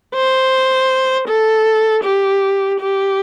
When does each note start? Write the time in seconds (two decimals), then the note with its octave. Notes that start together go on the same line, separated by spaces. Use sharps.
0.15 C5
1.28 A4
2.04 G4
2.80 G4